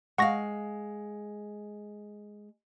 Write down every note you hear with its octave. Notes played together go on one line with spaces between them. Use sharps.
G#3 F5 F#5 C#6 A#6